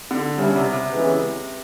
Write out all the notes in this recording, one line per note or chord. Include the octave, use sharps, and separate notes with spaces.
D3
C#3 G3 B3 E4
C3
C3
C#3 E3 G#3 B3